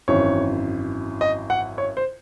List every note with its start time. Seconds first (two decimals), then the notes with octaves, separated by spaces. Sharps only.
0.08 G#1 F#2 E3 C#5
1.21 D#5
1.50 F#5
1.78 C#5
1.97 C5